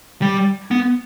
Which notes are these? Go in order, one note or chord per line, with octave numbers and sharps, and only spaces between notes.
G3
B3